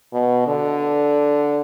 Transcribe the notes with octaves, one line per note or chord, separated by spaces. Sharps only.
B2
D3